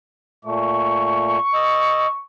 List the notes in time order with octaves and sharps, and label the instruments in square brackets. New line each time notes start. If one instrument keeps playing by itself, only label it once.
[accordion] A#2 A3 [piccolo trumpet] C#6
[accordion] D#5 E6